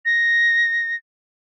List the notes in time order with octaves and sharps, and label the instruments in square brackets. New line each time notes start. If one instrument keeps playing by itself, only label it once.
[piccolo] A#6